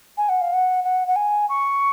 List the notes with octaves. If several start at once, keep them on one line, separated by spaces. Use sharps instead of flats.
G#5
F#5
F5
F#5
F#5
F#5
G#5
C#6